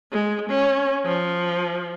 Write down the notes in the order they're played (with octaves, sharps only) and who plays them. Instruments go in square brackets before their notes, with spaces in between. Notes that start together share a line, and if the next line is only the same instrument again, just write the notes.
[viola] G#3
C#4
F3